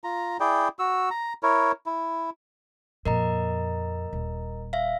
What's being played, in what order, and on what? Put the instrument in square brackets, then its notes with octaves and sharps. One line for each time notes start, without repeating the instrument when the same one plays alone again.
[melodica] F4 A#5
E4 G#4 D5 G5
F#4 E6
A#5
E4 A#4 C#5
E4
[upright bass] F2 A#2 [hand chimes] A#4 D#5 A#5
[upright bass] D#1
[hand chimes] E5 F5